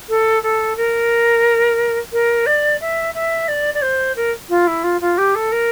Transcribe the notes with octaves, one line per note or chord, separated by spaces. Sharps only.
A4
A4
A#4
A#4
D5
E5
E5
D5
D5
C5
A#4
F4
E4
F4
F4
G4
A4
A#4